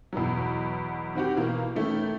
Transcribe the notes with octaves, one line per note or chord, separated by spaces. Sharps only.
E2 B2 E3 F#3
D#3 C4 F#4 G4
B2 E3 A#3
D#3 E3 A3 C#4 E4